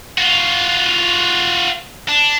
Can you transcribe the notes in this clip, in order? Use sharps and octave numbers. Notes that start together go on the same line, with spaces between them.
F4 F#4
D4